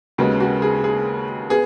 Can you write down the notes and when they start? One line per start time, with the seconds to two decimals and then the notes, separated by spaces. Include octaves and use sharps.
0.18 D#2 C#3 G#3 B3 F#4
0.40 F#4
0.62 G#4
0.84 G#4
1.50 B3 G#4